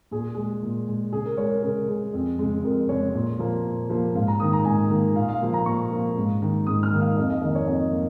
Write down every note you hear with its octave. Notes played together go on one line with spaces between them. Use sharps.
A#2 G#4
G#3 G#4
A#2
G#3
C#3 G#4
A#4
G#3 C#5
A#4
C#3 A#4
G#3
F2
C#3 G#3
F2 A#4
C#3 G#3 C#5
A#2
F3 A#3
A#2
F3 A#3
G#2 F5
A#5
D#3 A#3 D#6
A#5
G#2 G#5
D#3 A#3
A#2 F5
F5
F3 A#3
A#5
A#2 C#6
F3 A#3
G#2
D#3 A#3
G#2 D#6
F6
D#3 A#3
F5
F2 D#5
D#5
D#3 A#3 D#5
C#5
F2 D#5
A#3